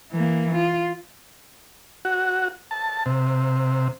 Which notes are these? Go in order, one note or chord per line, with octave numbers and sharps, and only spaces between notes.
E3 A#3
F4
F#4
A5
C3